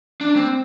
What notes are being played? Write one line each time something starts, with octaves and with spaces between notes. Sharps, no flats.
D4
C4